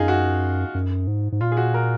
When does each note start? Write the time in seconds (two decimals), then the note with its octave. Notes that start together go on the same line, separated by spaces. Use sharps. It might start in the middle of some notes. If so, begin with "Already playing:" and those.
Already playing: F#2 D#4 F4 G#4
0.08 F#4
0.75 F#2
1.07 G#2
1.32 G#2
1.41 A#2 F4
1.52 G#4
1.57 F#4
1.74 A#4